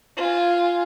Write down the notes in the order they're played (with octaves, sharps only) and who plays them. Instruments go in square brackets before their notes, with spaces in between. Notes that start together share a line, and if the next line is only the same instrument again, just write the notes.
[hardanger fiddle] F4 G#5